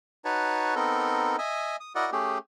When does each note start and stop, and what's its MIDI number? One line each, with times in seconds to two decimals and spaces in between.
0.25 0.75 63
0.25 0.75 66
0.25 0.75 71
0.25 0.75 73
0.25 0.75 81
0.76 1.36 59
0.76 1.36 60
0.76 1.36 63
0.76 1.36 69
0.76 1.36 70
1.39 1.76 75
1.39 1.76 76
1.39 1.76 80
1.80 1.93 87
1.95 2.10 64
1.95 2.10 66
1.95 2.10 70
1.95 2.10 74
1.95 2.10 75
1.95 2.10 78
2.12 2.38 57
2.12 2.38 61
2.12 2.38 67
2.12 2.38 68